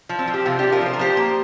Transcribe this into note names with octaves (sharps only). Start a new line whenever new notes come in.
F3
C4
F3
G4
C3 C4 F4
F3 D4 G4
F4 A#4
F3 C5
A#4
F3 G4 C5
A#3